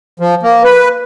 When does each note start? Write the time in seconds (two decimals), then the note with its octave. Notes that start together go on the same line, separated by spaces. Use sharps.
0.20 F3
0.43 A#3
0.64 B4